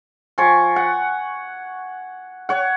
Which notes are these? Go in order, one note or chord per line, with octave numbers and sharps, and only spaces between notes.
F3 G#5 C#6
F#5
C#5 F#5